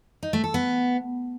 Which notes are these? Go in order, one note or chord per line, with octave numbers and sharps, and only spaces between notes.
D#4
A3
A4
B3